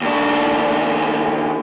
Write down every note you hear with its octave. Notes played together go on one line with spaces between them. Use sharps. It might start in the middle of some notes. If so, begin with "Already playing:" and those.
D#2 D4